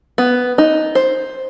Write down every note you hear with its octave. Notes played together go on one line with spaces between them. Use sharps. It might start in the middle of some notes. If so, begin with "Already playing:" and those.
B3
D#4
C5